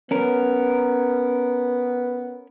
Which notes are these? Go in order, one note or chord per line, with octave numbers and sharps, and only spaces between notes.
B3 C#4 A#4